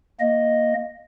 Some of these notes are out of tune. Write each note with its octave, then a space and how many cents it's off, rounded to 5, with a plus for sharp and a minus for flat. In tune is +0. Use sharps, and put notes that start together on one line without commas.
A#3 +0 D#5 +0